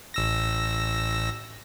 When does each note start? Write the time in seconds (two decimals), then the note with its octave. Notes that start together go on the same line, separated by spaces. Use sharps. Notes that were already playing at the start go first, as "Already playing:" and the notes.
0.14 A1 E6 A#6